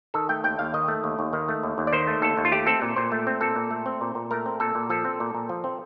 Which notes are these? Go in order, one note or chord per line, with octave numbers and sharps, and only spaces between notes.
D#3 A4
A3 G5
D#2 G5
D#2 F5
D#3 D#5
A3
D#2
D#2
D#3
A3
D#2
D#2
D5
D#3 C5
A3
D#2 A4
D#2
F4
A3 G4
C4 A4
A#2
A#2 C5
A3
C4
A#2 A4
A#2
A3
C4
A#2
A#2
A3 A#4
C4
A#2 A4
A#2
F3 A4
C4
A#2
A#2
F3
C4